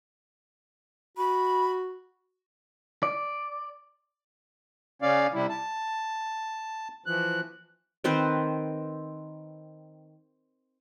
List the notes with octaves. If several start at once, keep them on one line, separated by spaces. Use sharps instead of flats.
F#4 B5
D5
C#3 C#4 D5 F5
C3 G3 E4
A5
E3 F3 F#6
D#3 C4 B4 C5